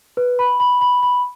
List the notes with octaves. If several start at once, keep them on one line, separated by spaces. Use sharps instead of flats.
B4
B5
B5
B5
B5